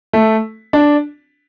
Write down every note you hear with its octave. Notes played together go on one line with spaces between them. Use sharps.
A3
D4